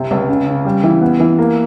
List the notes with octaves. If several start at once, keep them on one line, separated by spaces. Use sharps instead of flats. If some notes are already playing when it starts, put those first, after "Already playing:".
Already playing: C3
C#2
C#3
C#3
G3
E3
B3
E3
A#3